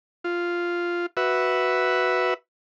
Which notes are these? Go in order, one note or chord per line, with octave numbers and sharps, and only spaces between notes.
F4
F#4 B4 E5